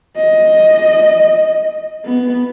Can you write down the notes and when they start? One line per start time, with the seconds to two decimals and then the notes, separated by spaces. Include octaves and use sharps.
0.17 D#5
2.05 B3